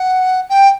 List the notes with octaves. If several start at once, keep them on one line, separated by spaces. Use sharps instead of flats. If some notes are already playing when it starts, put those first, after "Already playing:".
Already playing: F#5
G5